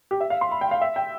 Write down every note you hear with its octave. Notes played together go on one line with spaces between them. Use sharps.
G4
E5
F5
C6
B5
G5
F5
E5
G5